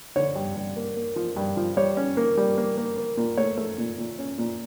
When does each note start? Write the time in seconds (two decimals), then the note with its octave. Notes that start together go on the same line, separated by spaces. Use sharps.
0.16 D3 C#5
0.36 G2
0.56 G2
0.76 A#3
0.96 A#3
1.16 F3
1.37 G2
1.57 F3
1.77 G3 C#5
1.97 C#4
2.17 A#3
2.37 G3
2.57 A#3
2.77 A#3
2.97 A#3
3.17 A#2
3.37 A3 C#5
3.57 A3
3.78 A#2
3.98 A#2
4.18 C#4
4.38 A#2